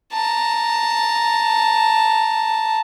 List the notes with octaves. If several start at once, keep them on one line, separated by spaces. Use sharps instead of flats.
A5 A#5